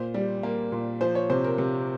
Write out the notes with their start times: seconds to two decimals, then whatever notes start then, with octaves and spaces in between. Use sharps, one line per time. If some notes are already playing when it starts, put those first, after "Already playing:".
Already playing: A#2 C5
0.14 G3
0.43 A#3
0.72 A#2
1.01 F3 C5
1.15 C#5
1.30 C3 C5
1.44 A#4
1.58 C3